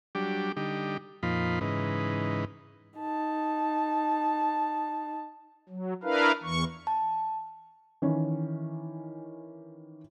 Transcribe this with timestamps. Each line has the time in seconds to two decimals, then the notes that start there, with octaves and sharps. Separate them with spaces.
0.15 F#3 G3 D4 G4
0.57 D3 G3 D#4 G4
1.23 F2 A#2 F3 D#4 F4 B5
1.61 G#2 C#3 E3 D#4 B4
2.99 D#4 A5
5.69 F#3
6.03 D4 E4 A#4 B4 F5
6.43 E2 E3 C#6
6.87 A5
8.02 D#3 E3 C#4